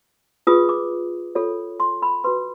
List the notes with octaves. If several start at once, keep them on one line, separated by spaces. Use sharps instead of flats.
F4 G#4 B4 D#6
D6
F4 A4 C#5
C6
B5
F#4 B4 C6